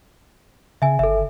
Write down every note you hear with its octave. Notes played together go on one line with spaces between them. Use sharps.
C#3 E5 G#5
G1 A4 E5